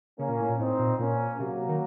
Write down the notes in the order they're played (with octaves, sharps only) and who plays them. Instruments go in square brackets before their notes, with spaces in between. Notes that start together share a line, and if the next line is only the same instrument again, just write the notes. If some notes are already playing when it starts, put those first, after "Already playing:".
[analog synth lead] C#3 [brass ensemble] A#3 C#4
[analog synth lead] A#2
A2
A#2
[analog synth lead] A2 [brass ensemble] C4 D#4
[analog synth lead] A#2
[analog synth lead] A#2 [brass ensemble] A#3 C#4
[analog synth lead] C3 [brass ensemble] F#3 A#3
[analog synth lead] C#3
C3
D#3